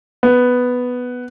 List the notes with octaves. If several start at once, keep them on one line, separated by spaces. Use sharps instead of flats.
B3